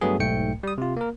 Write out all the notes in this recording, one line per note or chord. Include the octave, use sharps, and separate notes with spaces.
G2 F#3 A3 B3 G#4
B1 G#2 A3 G5 C#7
G3 D#6
C3 F4
A#3 A#4